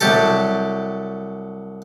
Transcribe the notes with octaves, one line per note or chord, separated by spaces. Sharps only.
C2 F#3 G4 A4